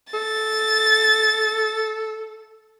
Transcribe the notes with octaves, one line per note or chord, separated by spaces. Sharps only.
A4 A6